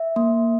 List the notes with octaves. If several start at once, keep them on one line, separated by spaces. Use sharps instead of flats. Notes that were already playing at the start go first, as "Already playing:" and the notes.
Already playing: E5
A#3